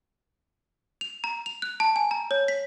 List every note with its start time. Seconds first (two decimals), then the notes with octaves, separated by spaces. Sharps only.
1.01 F7
1.24 A#5
1.46 F7
1.62 F#6
1.80 A5
1.96 G#5
2.11 A#5
2.31 C#5
2.48 B6